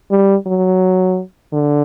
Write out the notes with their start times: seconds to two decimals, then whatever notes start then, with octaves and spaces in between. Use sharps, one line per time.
0.11 G3
0.46 F#3
1.53 D3